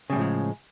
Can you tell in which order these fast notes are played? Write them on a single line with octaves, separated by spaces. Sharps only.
C#3 G3 A2 F3 G#3